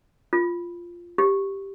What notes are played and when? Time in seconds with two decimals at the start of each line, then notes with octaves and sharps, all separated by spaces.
0.33 F4
1.18 G4